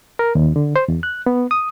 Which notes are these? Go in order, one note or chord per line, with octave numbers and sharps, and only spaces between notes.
A#4
D#2
D3
C5
E2
F#6
B3
D#6